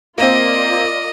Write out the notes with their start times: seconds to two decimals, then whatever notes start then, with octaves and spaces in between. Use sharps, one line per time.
0.18 A#3 C4 F4 A#4 D5 D#5